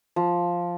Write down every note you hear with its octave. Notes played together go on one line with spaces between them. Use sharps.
F3